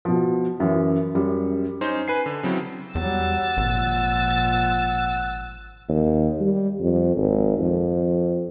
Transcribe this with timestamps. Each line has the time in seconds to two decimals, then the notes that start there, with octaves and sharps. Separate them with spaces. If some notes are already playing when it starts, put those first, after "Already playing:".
0.05 B2 F3
0.60 F#2 E3
1.15 F#2 G3
1.81 C#4 D#4 C5
2.08 B4 G#5 C7
2.26 D3
2.43 C#3 F#3 C4 E4
2.95 E2 F#3 G3 F#5 E6 A6
3.57 G#1 A#2 F3
5.89 D#2
6.40 G3
6.81 F2
7.17 G#1
7.59 F2